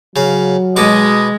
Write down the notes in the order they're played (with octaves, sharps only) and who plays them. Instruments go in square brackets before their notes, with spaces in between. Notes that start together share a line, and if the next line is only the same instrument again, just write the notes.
[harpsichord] C#3 F5 [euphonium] F#3
[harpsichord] B2 B4 D6 [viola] G#3 [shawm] D#5